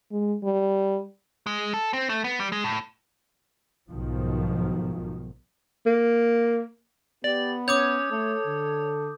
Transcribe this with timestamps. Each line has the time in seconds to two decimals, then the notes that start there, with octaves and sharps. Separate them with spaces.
0.12 G#3
0.44 G3
1.47 G#3
1.74 A4
1.93 C4
2.09 A3
2.24 B3
2.40 G3
2.52 G#3
2.64 A2
3.91 B1 G#2 B2 D#3 F3
5.86 A#3
7.24 B3 G4 D5
7.68 C#4 C#5 D6 D#6 G6
8.11 A3 A4
8.46 D3